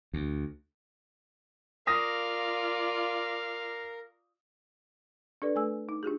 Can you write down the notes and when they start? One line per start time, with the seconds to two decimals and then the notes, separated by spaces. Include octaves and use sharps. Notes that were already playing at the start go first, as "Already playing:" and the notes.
0.14 D2
1.87 F4 A#4 D5 F5 D#6 A#6
5.42 D4 G4 A4 B4 D5
5.56 A3 A4 B4 G#5 E6
5.89 D#4
6.03 D4 F4 G4 G#4